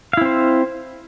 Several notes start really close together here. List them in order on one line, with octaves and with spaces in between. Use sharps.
F5 E4 C4 C5